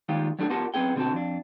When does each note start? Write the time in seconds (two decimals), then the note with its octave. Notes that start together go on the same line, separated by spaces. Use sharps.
0.09 D#2 D#3 G3 G#3 F4 G4
0.39 F#3 G3 A3 D4 F4 G#4
0.50 B3 F4 G4 A#4 F#5 A5
0.74 F#2 B3 C4 G#4 G5
0.96 B2 D3 A#3 C4 F#4 A5
1.13 F2 D4